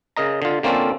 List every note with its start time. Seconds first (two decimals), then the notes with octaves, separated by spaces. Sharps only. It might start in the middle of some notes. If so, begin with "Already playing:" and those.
0.17 C#3 A#4 D#5 A#5
0.42 D3 F4
0.63 D3 A#3 C4 C#4 F4 A4